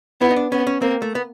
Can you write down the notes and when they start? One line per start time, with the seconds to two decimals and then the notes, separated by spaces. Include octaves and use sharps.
0.21 B3 E4
0.31 D#4
0.36 D4
0.52 B3 C#4
0.67 C#4
0.82 A#3 C4
1.02 A3
1.15 B3